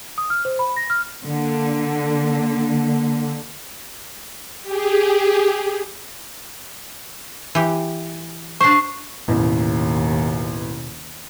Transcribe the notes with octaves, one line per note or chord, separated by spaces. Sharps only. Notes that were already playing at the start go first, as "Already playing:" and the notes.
D#6
F6
C5
B5
A#6
F6
D3 A#3
G4 G#4
E3 G4
D4 C5 C#6 C7
A1 D#2 B2